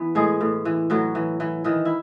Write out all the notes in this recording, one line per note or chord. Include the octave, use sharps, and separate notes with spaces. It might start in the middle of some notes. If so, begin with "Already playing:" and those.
Already playing: E3 B3
A2 G#3 G#4
A2
E3
A2 F#3 F#4
E3
E3
D#3 E3 D#4
E4